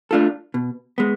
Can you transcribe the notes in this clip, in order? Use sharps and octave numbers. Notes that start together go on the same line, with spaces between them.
A3 D4 F4 A4
B2
G#3 B3